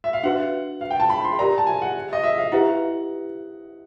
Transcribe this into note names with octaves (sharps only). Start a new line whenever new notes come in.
E5
F5
D4 F#4 B4 E5 F#5
F5
G5
A5
B5
C6
G4 A#4 D5 A#5
A5
G#5
F#5
D#5
E5
F5
E4 G4 B4 E5 F#5